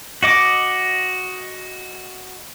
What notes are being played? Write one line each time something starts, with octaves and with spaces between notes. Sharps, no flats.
F#4 D#5 D6